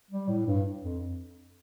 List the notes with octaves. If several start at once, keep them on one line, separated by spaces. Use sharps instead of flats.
G3
A2
G2
F2